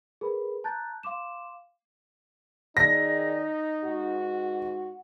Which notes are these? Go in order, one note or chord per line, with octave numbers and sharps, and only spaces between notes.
G#4 A#4 B4 B5
A5 A#5 F#6 G6 A6
F5 C6 D6 E7
D#3 D#4 G#4 D5 A#6
G#2 F#4 F#5